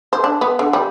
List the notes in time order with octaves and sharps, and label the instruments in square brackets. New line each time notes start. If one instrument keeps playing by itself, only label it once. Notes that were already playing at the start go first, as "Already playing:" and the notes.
[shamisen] C5
D4
B3
D3
G3